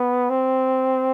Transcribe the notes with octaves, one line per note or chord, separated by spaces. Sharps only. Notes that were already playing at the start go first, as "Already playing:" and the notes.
Already playing: B3
C4